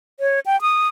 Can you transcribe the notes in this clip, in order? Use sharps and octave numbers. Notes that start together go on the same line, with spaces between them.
C#5
G5
D#6